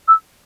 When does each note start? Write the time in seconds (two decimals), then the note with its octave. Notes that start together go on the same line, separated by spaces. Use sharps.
0.08 E6